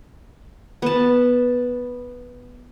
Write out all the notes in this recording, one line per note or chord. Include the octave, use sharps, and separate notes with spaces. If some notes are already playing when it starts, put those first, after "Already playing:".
B3 A5